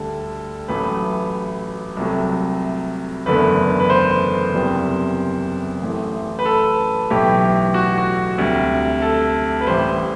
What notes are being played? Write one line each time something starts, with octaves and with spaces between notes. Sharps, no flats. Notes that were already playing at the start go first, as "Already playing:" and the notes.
Already playing: D2 D3 G3 A4
A1 A2 F#3 A3 B4
C2 C3 F#3 A3
F#1 E2 D3 A3 B4
B4
C5
F#1 E2 C3 E3 G3
A1 A2 E3 A3
B4
A4
B1 A2 E3 A3 G4
F#4
F#4
D2 C3 G3
A4
B4
A1 A2 E3 G3 C5